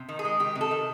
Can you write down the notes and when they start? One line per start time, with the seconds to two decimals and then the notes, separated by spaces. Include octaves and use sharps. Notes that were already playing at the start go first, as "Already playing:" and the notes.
Already playing: C3
0.09 D#3
0.19 G#4
0.24 G#3
0.39 D#3 G4
0.55 C3
0.61 A4
0.71 D#3